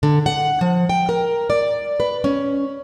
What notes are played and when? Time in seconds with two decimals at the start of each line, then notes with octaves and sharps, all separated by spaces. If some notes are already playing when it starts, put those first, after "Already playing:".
0.03 D3
0.26 F#5
0.61 F3
0.89 G5
1.09 A#4
1.50 D5
2.00 B4
2.24 C#4